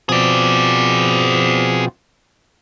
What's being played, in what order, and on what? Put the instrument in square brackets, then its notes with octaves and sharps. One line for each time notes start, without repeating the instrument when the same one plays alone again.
[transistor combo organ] B2 F3 C4 [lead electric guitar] G#4 D5